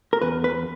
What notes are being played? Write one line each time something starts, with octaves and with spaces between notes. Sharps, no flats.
A#4
E2 B4
B4